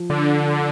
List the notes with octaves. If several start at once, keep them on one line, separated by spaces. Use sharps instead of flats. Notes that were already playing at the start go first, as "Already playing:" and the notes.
Already playing: F3
D3